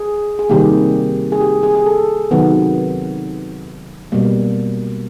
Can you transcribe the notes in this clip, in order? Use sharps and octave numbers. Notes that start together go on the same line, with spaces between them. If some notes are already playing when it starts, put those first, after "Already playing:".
Already playing: G#4
G#4
C3 D#3 G3 A#3 G4
G#4
G4
G#4
G#4
A4
C3 D#3 F#3 B3
B2 G3 A#3